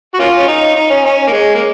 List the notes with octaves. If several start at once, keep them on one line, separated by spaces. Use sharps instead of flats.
F#4
A#3 C#4 F4
C#4
D#4
D#4
C#4
C#4
A#3
G#3
A#3